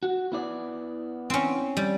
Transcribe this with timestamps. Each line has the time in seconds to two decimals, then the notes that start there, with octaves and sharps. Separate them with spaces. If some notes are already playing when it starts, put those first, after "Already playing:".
0.03 F#4
0.32 B3 E4 D5
1.30 C4 C#4
1.77 G3